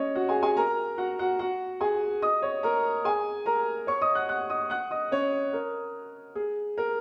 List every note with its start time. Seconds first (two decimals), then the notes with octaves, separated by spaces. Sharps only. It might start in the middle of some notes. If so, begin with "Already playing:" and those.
Already playing: C#4 C#5 D#5
0.15 F#4 F#5
0.29 G#4 G#5
0.43 G#4 G#5
0.57 A#4 A#5
0.98 F#4 F#5
1.19 F#4 F#5
1.39 F#4 F#5
1.81 G#4 G#5
2.22 D#5 D#6
2.42 C#5 C#6
2.63 A#4 A#5
3.04 G#4 G#5
3.46 A#4 A#5
3.87 C#5 C#6
4.01 D#5 D#6
4.15 F#5 F#6
4.29 F#5 F#6
4.50 D#5 D#6
4.70 F#5 F#6
4.91 D#5 D#6
5.12 C#4 C#5
5.53 A#4
6.35 G#4
6.78 A#4